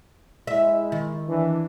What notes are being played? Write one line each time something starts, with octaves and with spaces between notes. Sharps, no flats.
G#3 E4 E5
D#3
E3 D4